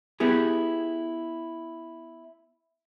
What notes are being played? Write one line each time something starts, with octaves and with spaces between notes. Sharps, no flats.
B3 E4 G4 G#4